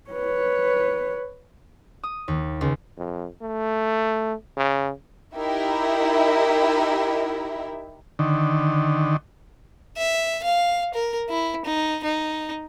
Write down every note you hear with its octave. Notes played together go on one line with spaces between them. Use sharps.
B4 C#5
D#6
D#2
C#2
F2
A3
C#3
D#4 E4 G4 A#4 E5
D3 D#3
E5
F5
A#4
E4
D#4
D#4